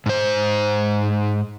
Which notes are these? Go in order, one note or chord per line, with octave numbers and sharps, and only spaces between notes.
G#2 C5